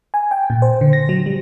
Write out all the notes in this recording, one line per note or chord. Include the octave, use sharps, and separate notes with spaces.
G#5
G5
A#2
C5
D3
A#6
F#3
G3